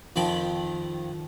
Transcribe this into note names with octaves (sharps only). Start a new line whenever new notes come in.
F2 D#3 F3 G5 B5